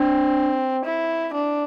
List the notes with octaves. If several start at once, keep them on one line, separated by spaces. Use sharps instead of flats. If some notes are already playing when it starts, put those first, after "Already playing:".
Already playing: C4 D4
E4
D4